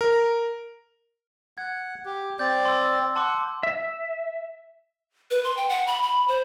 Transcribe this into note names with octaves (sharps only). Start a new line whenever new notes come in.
A#4
F#5 G#6
G4
C4 D5 G6
C6 E6
F#5 A5 C6 D6
E5
B4
C6
G5
F#5
B5
B5
C5